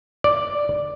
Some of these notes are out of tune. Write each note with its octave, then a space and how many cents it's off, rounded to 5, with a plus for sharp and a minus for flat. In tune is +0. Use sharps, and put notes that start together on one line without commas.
D5 +0